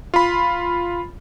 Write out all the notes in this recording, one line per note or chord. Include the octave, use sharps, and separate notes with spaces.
F4 B5